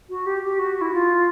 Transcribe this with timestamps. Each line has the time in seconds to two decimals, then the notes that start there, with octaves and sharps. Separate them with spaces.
0.10 F#4
0.26 G4
0.43 G4
0.59 F#4
0.81 E4
0.92 F4